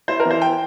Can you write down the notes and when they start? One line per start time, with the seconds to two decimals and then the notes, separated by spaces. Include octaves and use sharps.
0.08 E4 C5
0.20 A#4
0.25 E3
0.31 C5
0.41 G5